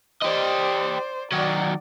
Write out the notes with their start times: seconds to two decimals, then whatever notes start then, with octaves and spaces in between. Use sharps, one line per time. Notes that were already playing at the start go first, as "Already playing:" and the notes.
0.22 G4 C5 D5 D#5
1.32 D#3 F#3 F#4 D5